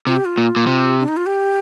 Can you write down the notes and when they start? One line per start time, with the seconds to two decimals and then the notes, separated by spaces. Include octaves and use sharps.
0.07 C3 F4
0.16 G4
0.25 F4
0.38 A#2
0.56 A#2
0.67 C3
1.00 D4
1.08 D#4
1.17 F4
1.26 G4